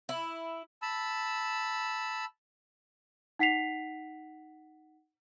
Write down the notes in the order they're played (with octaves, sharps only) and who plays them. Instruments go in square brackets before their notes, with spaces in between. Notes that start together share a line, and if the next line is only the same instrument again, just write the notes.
[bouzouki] E4
[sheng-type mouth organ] A5 B5 E6
[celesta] D#4 F#5 B6 C7 F7